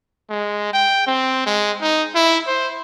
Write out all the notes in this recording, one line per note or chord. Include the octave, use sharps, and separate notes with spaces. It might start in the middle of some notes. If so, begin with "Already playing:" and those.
G#3
G5
C4
G#3
D#4
E4
C5